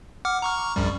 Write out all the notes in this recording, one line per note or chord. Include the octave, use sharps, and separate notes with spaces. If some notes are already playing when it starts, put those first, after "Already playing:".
F#5 D6 F6
A#5 C#6 F6
A#1 F#2 G3